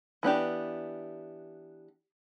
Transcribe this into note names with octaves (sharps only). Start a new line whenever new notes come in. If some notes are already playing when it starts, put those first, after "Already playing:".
E3 B3 D4 G4